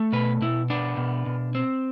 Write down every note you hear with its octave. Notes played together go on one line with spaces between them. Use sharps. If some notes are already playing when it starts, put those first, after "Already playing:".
Already playing: A3
B2 B4
B2 E4
B3 D4
B2
B2
C4